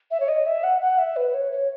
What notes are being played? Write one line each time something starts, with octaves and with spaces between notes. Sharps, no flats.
E5
C#5
D#5
E5
F#5
F#5
E5
B4
C#5
C#5